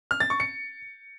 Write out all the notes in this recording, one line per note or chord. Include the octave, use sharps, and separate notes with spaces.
F6
A6
C#6
C#7